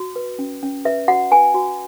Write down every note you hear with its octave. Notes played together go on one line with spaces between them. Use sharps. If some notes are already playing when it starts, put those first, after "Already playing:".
Already playing: F#4
B4
C#4
C#4
B4 E5
F#4 F#5
B4 G#5
F#4